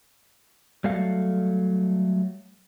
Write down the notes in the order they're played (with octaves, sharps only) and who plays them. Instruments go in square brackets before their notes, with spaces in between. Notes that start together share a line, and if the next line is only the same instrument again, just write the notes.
[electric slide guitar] F#3 G3 A3 A4 F5